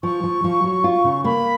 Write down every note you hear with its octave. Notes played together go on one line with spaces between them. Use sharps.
F3 C#6
F3
F3
F#3
F4
C#3
A#3 B5